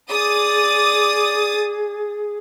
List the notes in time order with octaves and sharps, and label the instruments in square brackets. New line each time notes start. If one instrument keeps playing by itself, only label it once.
[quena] G#4 [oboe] D5 [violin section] D#6 A6